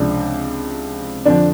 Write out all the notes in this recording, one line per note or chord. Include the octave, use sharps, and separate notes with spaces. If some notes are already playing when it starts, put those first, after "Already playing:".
Already playing: C#2 C3 F3 D4
F2 D3 F3 D4